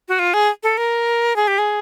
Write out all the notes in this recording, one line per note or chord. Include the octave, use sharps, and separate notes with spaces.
F#4
F4
G#4
A4
A#4
G#4
G4
G#4